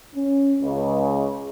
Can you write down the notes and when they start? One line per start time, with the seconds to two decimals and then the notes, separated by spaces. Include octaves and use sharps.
0.15 C#4
0.62 C#2